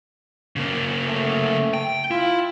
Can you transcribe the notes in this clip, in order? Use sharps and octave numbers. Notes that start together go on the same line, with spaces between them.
C#3 A#3
A3
G5
E4 F4